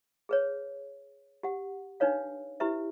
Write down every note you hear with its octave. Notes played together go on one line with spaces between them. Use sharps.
G#4 B4 C#5
G4 F#5
D4 D#4 B4 C#5 F5
E4 G4 B4 E5